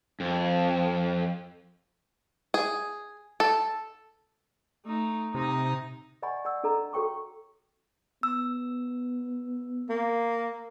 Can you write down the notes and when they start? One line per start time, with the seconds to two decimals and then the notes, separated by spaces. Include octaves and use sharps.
0.20 F2
2.54 G#4
3.40 A4
4.86 A3 D#4
5.34 C3 D#4 D#5
6.23 D5 D#5 F#5 G#5 B5 C#6
6.45 D5 F#5 E6
6.64 D4 A4 D#5 A#5
6.93 F#4 A4 C#5 G5 C#6 D6
8.23 B3 E6
9.89 A#3